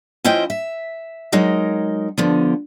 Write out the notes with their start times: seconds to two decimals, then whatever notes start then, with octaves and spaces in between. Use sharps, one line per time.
0.25 F3 C#4 E4 C5 D#5 G5
0.50 E5
1.32 F#3 G#3 D#4 A#4
2.18 D3 F3 B3